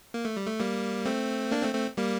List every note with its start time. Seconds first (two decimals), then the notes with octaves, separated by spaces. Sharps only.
0.14 A#3
0.25 A3
0.37 G3
0.47 A3
0.60 G3 A#3
1.05 A3 C4
1.51 A#3 D4
1.62 A3 C4
1.74 A3 C4
1.97 G3 A#3